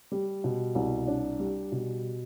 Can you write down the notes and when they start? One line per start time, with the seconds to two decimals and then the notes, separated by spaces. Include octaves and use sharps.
0.12 G3
0.44 B2
0.75 C2
1.07 D4
1.40 G3
1.72 B2